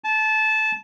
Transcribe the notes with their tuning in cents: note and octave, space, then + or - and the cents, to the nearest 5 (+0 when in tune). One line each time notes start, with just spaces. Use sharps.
A5 -20